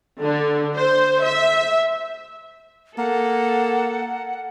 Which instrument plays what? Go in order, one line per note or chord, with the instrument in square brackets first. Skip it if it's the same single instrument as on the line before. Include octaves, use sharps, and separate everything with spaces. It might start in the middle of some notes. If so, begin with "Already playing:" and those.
[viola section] D3
C5
E5
[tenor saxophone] A#3 [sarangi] A4 [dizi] F#5